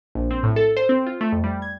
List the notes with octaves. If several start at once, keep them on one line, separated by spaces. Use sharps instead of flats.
A#1
C4
A2
A4
C5
C4
F4
A3
F2
G3
G#6